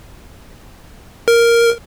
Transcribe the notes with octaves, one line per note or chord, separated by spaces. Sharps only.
A#4